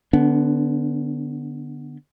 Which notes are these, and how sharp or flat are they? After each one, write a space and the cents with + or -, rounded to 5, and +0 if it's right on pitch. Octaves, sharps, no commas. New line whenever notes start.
D3 +15 B3 +0 D4 -35